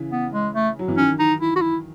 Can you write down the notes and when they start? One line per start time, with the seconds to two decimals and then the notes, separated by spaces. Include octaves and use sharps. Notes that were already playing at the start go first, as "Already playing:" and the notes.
Already playing: C#3 E3
0.12 B3
0.34 G#3
0.55 A3
0.79 F#3
0.88 E3
0.97 D#3 C#4
1.19 D#4
1.40 E4
1.56 F#4
1.62 E4